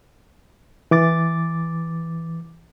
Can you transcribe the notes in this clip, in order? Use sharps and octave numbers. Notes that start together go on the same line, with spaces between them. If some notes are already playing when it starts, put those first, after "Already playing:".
E3 D6 A6